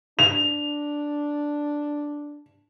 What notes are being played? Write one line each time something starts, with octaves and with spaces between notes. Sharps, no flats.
D4 F7